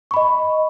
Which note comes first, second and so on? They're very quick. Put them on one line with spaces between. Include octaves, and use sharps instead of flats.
C#6 B5 D#5